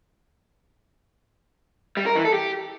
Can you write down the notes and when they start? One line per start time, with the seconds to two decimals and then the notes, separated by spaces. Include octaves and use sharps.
1.97 G3
2.06 A#4
2.15 E3
2.25 A4
2.34 G4